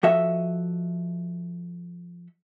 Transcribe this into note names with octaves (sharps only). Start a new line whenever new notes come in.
F3 F#4 A4 D#5 E5